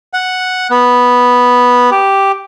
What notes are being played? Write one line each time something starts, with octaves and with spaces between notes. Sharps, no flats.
F#5
B3
G4